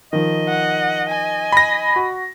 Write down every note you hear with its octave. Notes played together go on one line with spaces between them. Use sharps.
D#3 F3 D#5
F#5
G#5
B5 A#6
F#4